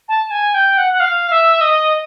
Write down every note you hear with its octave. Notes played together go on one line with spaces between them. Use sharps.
A5
G#5
G5
F#5
F#5
F5
E5
D#5